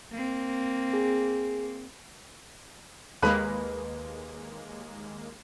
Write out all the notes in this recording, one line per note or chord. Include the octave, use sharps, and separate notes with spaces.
A#3 C4
G#4
D#2 G#3 A#3 B4 B5